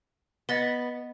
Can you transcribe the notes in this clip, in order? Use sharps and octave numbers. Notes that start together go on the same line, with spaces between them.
B3 D#5 A6 G7